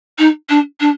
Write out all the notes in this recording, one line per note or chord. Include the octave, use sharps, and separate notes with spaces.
D#4
D4
D4